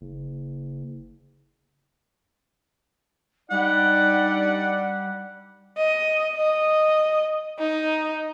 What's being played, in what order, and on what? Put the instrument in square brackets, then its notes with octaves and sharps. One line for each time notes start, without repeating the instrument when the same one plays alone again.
[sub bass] F#1
[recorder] G3 [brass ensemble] D4 D#4 D5 [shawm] F#5
[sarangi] D#5
D#5
D#4